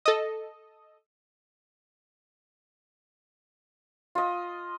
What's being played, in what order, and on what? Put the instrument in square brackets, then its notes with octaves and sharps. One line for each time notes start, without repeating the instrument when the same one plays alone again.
[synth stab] A4 D#5
[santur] F4 D#5